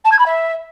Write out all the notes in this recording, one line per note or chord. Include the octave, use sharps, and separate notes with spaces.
A5
G#6
B5
E5